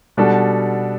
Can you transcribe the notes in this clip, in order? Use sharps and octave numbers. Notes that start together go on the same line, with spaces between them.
B2 G3 D4 F#4 A4